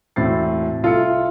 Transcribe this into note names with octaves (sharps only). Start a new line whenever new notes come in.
E1 A2 C4 A6 C7
C2 F4 A4 E5 C#7